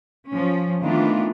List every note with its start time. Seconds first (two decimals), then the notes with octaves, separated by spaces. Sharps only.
0.30 F3 C#4
0.83 D#3 E3 A3 B3 D4 F4